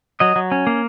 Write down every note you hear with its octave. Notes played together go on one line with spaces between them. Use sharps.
F#3 D#5
F#3
C#4
A#3